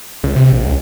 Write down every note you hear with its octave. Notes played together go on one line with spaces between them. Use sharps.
C#2
C3
A#1
C#2